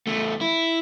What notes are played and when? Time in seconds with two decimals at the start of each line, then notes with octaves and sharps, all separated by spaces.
0.07 E2 A3
0.41 E4